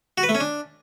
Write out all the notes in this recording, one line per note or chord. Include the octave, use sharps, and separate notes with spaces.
F#4
B4
A3
C#4
D4